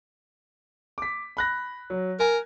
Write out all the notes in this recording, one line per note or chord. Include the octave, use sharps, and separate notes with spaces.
D6 B6
B5 F#6 A#6
F#3
A#4 G#5